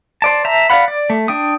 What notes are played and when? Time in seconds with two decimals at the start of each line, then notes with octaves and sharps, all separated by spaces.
0.22 C5 D5 A5
0.45 C5 E5 A5 A#5
0.70 D5 F5 F#5 B5
0.88 D5
1.10 A3
1.28 D4 G5 D#6